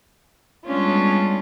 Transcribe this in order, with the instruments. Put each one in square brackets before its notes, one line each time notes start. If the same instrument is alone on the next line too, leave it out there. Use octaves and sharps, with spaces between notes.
[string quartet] G3 G#3 B3 C#4 D4 F4